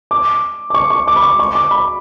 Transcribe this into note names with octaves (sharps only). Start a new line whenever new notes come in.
D6
D6
C#6
C#6
D6
B5
C#6
C#6
D6
B5